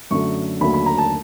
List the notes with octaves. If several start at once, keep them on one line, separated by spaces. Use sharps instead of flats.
F#2 D3 F#3 A3 C#6
D#2 D3 F#3 A3 B5
B5
A#5
A5